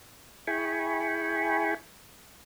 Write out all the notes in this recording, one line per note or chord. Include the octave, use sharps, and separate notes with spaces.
E4 G#4 G5 G#5 B5 C#6